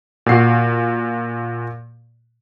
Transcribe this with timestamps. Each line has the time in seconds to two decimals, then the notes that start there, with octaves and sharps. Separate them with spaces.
0.26 A#2 F#4 C7